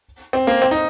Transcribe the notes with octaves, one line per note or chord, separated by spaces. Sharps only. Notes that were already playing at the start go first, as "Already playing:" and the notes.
C4
A#3
C4
D#4